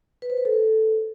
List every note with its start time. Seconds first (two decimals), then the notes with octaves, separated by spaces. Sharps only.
0.22 B4
0.30 C5
0.38 B4
0.45 A4